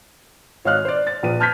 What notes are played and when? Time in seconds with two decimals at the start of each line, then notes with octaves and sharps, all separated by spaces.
0.65 G#1 C#5 D#5 F5 F6 F#6
0.85 C5 D5
1.07 A6
1.23 A#1 B4 D#7
1.40 A5 F6 G6 G#6 B6